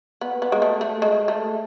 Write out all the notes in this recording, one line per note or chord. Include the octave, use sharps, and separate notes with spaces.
B3
B3
G#3
A3
A3
G#3
A3